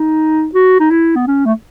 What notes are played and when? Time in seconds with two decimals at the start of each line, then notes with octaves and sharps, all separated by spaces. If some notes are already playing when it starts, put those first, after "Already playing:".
Already playing: D#4
0.54 F#4
0.80 D#4
0.91 E4
1.16 B3
1.27 C#4
1.46 A3